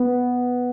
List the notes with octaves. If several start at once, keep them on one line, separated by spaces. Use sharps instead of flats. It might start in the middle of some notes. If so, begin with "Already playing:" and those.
Already playing: B3